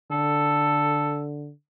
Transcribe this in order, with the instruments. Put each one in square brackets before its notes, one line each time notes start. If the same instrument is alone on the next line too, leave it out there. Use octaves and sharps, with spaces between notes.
[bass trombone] D3 [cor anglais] A4